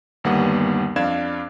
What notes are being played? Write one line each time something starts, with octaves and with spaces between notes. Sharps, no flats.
G1 D#2 G3 A#3 B3 F#5
F2 D4 D5 F5 G#6 E7